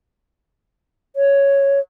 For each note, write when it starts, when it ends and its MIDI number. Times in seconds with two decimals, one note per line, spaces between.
1.16 1.80 73